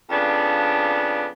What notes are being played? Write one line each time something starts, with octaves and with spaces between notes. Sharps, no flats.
F2 C#3 B3 D4